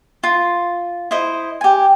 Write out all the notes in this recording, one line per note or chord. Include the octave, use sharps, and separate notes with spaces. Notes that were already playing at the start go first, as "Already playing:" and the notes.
F4
E4 C5 D#5
G4 G#5